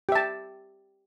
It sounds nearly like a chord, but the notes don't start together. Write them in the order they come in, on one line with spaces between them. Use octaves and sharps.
G4 E5 A5